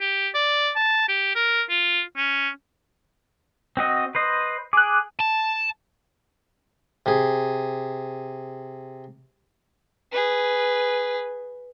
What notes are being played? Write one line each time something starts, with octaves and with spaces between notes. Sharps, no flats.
G4
D5
A5
G4
A#4
F4
C#4
C4 F#4 D#5
B4 C5 D#5
G#4 D6 F#6
A5
C3 G#4
G#4 B4